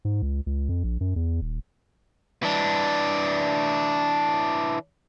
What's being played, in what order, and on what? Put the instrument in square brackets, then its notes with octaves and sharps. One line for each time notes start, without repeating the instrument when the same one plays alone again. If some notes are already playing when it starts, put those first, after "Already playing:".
[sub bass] G#2
C#2
C#2
F2
A#1
F#2
E2
D#1
[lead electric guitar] E3 D4